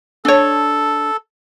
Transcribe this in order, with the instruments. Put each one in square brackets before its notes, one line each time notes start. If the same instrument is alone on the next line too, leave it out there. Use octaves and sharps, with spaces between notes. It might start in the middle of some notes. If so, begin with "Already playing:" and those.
[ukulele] D4 C#5 [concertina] A4